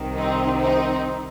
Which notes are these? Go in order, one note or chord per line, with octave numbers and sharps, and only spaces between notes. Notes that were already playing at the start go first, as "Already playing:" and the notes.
Already playing: C2 C3 D#3
C4 D#4
C4 D#4